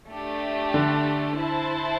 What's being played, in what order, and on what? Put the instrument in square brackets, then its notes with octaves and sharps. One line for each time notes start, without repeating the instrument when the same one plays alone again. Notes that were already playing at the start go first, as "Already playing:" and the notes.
[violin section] A3 D4 G4
[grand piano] D3
[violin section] E4 C5 A5